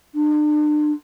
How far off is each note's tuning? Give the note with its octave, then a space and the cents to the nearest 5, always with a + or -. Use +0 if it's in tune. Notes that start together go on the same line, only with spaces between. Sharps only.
D4 +40